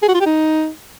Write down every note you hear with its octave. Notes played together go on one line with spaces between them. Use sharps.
G#4
F#4
F4
G4
D#4